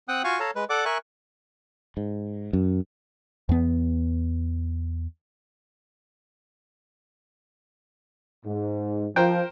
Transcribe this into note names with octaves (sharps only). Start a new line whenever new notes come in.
C4 F#5 G5 D#6 F#6
F4 F#4 F5 G#5 C#6
A4 C#5 F5 A5 A#5
G#3 B4
A4 D5 F#5 D6
A#4 E5 G#5 C#6 F#6
G#2
F#2
E2 B3
G#2
F3 A#4 C5 G5